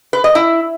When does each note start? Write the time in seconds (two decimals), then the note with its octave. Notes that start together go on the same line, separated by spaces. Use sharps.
0.13 B4
0.24 D#5
0.35 E4